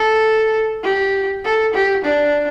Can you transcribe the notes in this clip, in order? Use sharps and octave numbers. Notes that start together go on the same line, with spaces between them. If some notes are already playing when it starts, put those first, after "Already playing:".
Already playing: A4
G4
A4
G4
D4